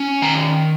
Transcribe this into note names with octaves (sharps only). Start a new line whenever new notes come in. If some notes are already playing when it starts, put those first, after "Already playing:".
Already playing: C#4
D#3 A#5